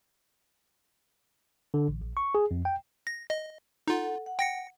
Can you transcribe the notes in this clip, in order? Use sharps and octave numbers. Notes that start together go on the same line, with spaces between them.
D3
A1
A#1
C#6
G#4
F2
G5
A#6
D#5
D#4 F4 A4 F#5
F#5
G5 A#6 C#7